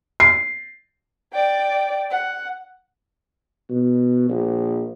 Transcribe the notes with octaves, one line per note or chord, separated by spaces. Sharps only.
C7
D5 G5
F#5
B2
A#1